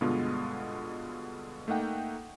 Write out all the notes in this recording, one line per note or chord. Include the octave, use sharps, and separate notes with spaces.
G2 B2 D3 G#3 B3 F4
A3 A#3 D#4 F#5 G5